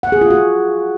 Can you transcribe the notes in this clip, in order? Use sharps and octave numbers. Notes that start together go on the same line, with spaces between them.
F#5
G#4
F4
F#4